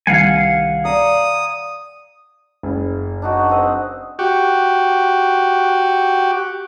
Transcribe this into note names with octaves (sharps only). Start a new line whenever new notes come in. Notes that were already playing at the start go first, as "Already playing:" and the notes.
C2 D#3 F5 F#5 G#5
D5 A#5 D#6
F#1
D4 D#4 F#4
C4 D#5
F#4 G4